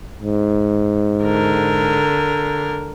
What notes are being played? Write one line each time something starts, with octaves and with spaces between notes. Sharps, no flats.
G#2
D3 A#4